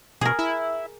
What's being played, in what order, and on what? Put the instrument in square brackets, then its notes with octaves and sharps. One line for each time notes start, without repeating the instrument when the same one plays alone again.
[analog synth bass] B2 [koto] G#4 A#4
[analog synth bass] E4